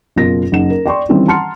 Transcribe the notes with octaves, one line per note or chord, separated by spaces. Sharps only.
F#1 B2 F4 A#4 A#6
F#1 D#4 F#5 E7
A#4
D5 G5 C6 C#6
D#3 E3 G3 C4 C#4
F#5 A5 A#5 C6 F6 C#7